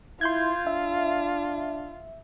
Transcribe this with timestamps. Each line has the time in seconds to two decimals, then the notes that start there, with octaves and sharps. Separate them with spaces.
0.21 E4 F4 C6 G6 G#6
0.67 D4 E5